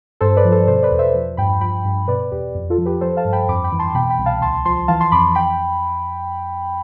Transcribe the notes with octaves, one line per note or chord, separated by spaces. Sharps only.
G2 A4 C5
B4 D5
F3
A4 C5
B2 A4 C5
B4 D5
E2
C5 E5
F3
G2 G5 B5
F3 G5 B5
G2
B2 B4 D5
E2 G4
F2
F4 A4
F3
G4 B4
F3 A4 C5
F5 A5
G2
G5 B5
F2 B5 D6
G5 B5
E3
A5 C6
B2 G5 B5
G5 B5
C2
F5 A5
D2 A5 C6
F3 A5 C6
E3 F5 A5
A5 C6
F2 B5 D6
G5 B5